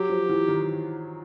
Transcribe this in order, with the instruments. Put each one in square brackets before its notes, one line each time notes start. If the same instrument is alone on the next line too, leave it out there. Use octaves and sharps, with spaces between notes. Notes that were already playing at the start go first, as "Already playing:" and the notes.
Already playing: [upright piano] F#3 [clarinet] G4
[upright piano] F3
E3
D#3